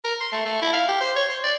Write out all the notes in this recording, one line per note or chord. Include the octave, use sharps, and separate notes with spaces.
A#4
C6
A3
A3
E4
F5
G4
C5
C#5
C5
D5